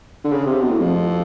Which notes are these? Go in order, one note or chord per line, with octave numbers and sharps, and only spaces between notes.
D3
C#3
C3
B2
A2
F2